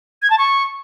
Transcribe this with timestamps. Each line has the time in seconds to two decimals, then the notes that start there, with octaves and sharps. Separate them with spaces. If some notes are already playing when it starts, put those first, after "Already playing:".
0.22 G#6
0.30 A5
0.38 C#6